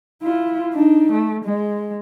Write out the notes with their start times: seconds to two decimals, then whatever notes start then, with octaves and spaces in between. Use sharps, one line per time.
0.23 E4 F4
0.74 D4 D#4
1.12 A3
1.45 G#3